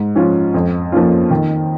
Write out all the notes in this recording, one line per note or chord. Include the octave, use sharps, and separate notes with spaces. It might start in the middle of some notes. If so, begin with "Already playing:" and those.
Already playing: G#2
F3 C#4 F4
F2
F3 A#3 C#4 F4
D#3